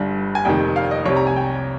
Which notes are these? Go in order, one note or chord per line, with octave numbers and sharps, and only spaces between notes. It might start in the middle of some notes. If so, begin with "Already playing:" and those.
Already playing: G1 G2 G3
G#5
F1 F2 C3 D#3 G5
F5
D#5
C2 C3 G3 C#5
A#5
G#5
G5